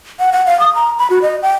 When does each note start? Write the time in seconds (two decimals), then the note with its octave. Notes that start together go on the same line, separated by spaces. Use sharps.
0.20 F#5
0.32 F#5
0.46 F5
0.60 D#6
0.75 A#5
0.99 B5
1.10 F#4
1.22 D#5
1.42 G5